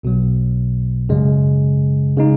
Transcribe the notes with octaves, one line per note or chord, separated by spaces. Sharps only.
B1 B2 F#3
F#2 C#3 G#3
C#3 G#3 D#4